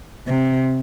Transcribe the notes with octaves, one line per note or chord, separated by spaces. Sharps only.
C3